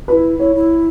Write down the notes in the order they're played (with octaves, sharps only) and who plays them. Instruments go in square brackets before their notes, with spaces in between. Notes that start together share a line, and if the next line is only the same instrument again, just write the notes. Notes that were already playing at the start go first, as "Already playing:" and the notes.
[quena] F#4 [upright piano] B4
[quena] E4
[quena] E4 [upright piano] C#5
[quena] E4